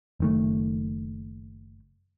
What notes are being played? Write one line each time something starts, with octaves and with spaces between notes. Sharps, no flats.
F#1 D#3 A3